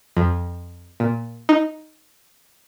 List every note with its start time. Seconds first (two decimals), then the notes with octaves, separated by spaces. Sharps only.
0.17 F2
1.00 A#2
1.49 D#4